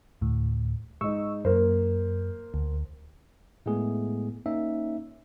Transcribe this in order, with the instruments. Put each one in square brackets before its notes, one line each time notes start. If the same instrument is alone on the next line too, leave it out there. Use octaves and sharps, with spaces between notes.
[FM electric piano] D2 A2
[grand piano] G#2 D#4 [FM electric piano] C#6 E6
[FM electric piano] F#2 [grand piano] A#3 A#4 C5
[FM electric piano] D2
[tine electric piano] A2 G#3 A3 B3 E4 G#4
A#3 C#4 D#4 E5